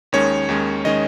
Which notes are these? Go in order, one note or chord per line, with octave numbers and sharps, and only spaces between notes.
D#2 D#3 G#3 C#4 C#5
D#2 D#3 G#3 C#4
D#3 G#3 C#4 D#5